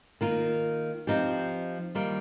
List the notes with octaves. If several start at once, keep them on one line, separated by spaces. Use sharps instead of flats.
D#3 A#3 F4
F3 C4 D#4 G4
D#3 G3 A#3 F4